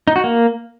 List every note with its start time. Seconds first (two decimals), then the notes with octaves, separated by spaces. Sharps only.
0.07 D#4
0.16 F#4
0.24 A#3